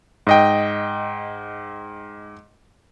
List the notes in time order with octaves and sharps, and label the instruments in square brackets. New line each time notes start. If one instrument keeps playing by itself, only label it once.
[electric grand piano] G#2 D#5 G5